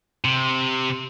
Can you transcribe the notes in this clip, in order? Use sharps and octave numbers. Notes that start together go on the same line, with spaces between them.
C3